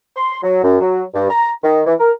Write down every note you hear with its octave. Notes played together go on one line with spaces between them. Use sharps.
C6
F#3
F#2
F#3
G2
A#5
D#3
E3
A#4